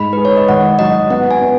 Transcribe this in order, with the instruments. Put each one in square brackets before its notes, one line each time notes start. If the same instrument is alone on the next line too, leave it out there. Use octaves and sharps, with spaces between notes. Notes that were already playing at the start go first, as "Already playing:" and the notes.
Already playing: [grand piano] G#2 [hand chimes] B5
[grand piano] G#4 [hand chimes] B4
[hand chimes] C#5
D#5
[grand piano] G#1 [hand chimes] F#5
[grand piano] F#3 [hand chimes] D#5
[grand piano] B3 [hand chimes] F#5
[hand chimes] G#5
[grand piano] B3